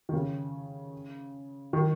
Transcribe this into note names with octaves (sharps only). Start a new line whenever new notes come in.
D#3
C#3
D#3